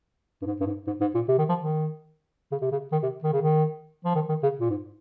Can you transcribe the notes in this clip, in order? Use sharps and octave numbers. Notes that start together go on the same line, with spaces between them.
G2
G#2
G2
G#2
G#2
G#2
A#2
C3
D#3
F3
D#3
C#3
C3
C#3
D#3
C3
D#3
C#3
D#3
F3
D#3
D#3
C#3
A#2
G#2